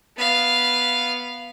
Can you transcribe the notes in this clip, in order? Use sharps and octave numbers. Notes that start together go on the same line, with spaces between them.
B3 F5